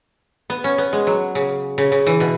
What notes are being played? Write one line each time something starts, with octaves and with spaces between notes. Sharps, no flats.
B3
C#4
B3
G#3
F#3
C#3
C#3
C#3
E3
B2